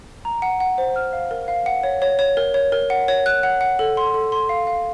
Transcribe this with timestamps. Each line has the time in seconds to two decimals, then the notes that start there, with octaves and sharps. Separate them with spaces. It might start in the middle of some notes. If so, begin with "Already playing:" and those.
0.25 A#5
0.42 F#5
0.60 F#5
0.78 C5
0.96 F6
1.13 F5
1.31 A#4
1.48 F5
1.66 F#5
1.83 C#5
2.02 C#5
2.19 C#5
2.37 A#4
2.54 C#5
2.72 A#4
2.90 F#5
3.08 C#5
3.26 F#6
3.43 F#5
3.61 F#5
3.79 A4
3.97 C6
4.14 A4
4.32 C6
4.49 F5
4.67 F5